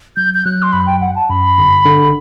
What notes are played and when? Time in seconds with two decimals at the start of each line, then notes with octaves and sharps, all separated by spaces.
0.16 F#3 G6
0.34 G6
0.45 F#3 F#6
0.62 C6
0.73 F#2 B5
0.87 G5
1.01 G1 F#5
1.16 A5
1.29 F#2 B5
1.58 G1
1.85 D3